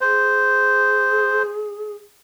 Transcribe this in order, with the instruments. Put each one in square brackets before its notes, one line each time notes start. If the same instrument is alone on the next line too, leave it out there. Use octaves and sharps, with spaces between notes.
[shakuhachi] G#4 [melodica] C5